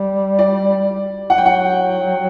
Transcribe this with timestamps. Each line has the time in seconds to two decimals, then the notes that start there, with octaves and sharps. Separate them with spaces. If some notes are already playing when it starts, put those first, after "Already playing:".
Already playing: G3
0.39 D5
1.30 F#3 F#5
1.38 G5
1.46 F#5